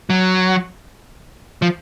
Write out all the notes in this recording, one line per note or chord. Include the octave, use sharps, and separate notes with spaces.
F#3
F3